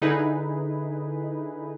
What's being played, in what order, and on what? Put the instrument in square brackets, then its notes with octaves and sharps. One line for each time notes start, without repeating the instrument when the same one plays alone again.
[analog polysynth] D3 D#4 E4 G#4 B4